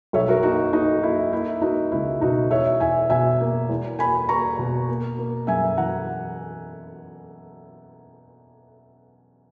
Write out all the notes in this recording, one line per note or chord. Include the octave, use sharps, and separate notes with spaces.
B1 C#5 E5
F#4 A#4
A#3 D#4 F#4
A#3 D#4 F#4
A#3 E4
A#3 E4
A#3 D#4 F#4
C#2 E4
B2 D#4 F#4
E2 C#5 E5
E2 E5 G#5
B2 E5 G#5
A#3
E2
A#3 G#5 B5
A#3 A#5 C#6
B2
A#3
A#3
F#2 E5 G#5
E3 F#5 A#5